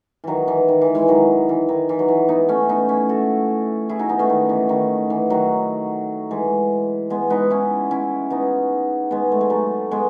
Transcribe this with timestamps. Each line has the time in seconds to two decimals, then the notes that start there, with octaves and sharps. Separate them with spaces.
0.24 D#3 E3 F#3
0.48 E3
0.68 D#3
0.81 E3
0.94 E3 G#3
1.08 D#3 F#3
1.49 E3
1.69 D#3
1.89 E3
1.99 F#3
2.08 E3
2.29 B3 D#4
2.49 A3 C#4
2.69 B3 D#4
2.89 C#4 E4
3.09 F#4 A4
3.89 E4 G#4
3.99 D#4 F#4
4.09 B3 D#4
4.19 A3 C#4
4.30 D#3
4.49 E3
4.69 D#3
5.10 E3
5.30 D#3 F#3
6.31 E3 G#3
7.10 G#3 B3
7.30 B3 D#4
7.50 C#4 E4
7.91 C#4 E4
8.30 B3 D#4
9.11 G#3 B3
9.32 A3
9.41 G#3
9.50 F#3 A3
9.91 G#3 B3